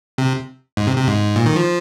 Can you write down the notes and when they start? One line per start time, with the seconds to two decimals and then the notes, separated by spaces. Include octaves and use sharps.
0.18 C3
0.77 G#2
0.87 C3
0.97 C3
1.07 G#2
1.36 A#2
1.46 D#3
1.56 F3